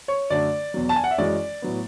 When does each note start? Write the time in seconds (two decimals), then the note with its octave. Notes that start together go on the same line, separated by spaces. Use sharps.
0.08 C#5
0.30 F#2 D3 A3 D4 D5
0.74 E2 B2 F#3
0.89 A5
0.96 G#5
1.04 F#5
1.11 E5
1.18 F#2 E3 G#3 C#4 D5
1.62 A2 F#3 B3